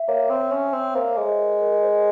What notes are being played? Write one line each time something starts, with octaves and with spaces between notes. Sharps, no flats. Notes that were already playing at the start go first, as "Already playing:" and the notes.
Already playing: E5
A#3 C#5
C4
C#4
C4
A#3 C5
G#3
A#4
A#4
C5